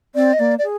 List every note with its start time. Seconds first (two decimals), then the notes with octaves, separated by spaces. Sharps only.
0.15 C4 D5
0.33 D#5
0.39 A#3 D5
0.58 D5
0.63 G#4